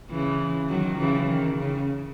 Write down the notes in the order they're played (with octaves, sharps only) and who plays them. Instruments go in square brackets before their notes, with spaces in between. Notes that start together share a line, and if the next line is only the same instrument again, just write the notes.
[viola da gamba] C#3 E3
D#3 F#3
C#3 E3
D#3
C#3